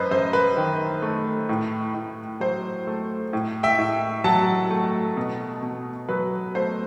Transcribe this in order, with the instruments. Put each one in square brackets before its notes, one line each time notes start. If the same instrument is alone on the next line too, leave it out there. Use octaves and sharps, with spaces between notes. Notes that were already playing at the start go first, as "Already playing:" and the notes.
Already playing: [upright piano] F#2 B4 C5 D#5
F#2 C5
B4
D#3
A3
A2
A2
F#3 C5
A3
A2
E5 G5
A2
F#3 F#5 A5
A3
B2
B2
F#3 B4
A3 C5